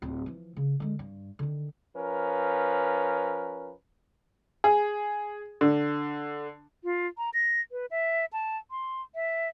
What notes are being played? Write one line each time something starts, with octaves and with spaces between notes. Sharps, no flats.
D1 C4
E3 F3
C#3
D3 G#3
G2
D3 D#3
F3 C#4 A#4 B4
G#4
D3
F4
A#5
A#6
B4
E5
A5
C6
E5